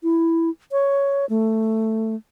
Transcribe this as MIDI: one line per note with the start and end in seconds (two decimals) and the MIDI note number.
0.03 0.50 64
0.72 1.26 73
1.29 2.15 57